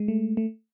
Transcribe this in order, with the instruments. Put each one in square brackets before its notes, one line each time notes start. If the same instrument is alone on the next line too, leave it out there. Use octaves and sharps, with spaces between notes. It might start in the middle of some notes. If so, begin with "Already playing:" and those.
Already playing: [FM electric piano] G#3
A3
A3